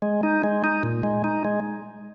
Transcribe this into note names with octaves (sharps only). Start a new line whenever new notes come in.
G#3
D#4
G#3
D#4
A#2
G#3
D#4
G#3